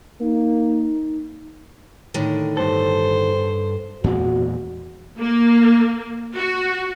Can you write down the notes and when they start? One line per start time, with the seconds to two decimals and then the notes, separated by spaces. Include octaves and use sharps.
0.20 A#3 D#4
2.14 A2 D3 D#3
2.57 G2 A4 C5
4.04 E2 A#2 G#3 F#4
5.18 A#3
6.36 F#4